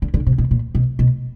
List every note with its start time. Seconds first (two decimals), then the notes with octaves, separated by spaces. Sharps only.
0.02 D3
0.14 D3
0.27 C3
0.38 B2
0.51 A#2
0.75 B2
0.99 B2